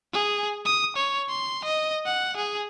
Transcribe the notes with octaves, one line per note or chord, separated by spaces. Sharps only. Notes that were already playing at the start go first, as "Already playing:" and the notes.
G#4
D#6
C#5
C6
D#5
F#5
G#4